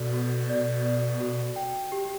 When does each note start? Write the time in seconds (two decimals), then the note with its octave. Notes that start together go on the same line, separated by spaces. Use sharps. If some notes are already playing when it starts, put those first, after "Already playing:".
Already playing: B2 F#4 A4 D5
0.14 F#4
0.50 D5
0.85 D5
1.21 F#4
1.56 G5
1.92 G4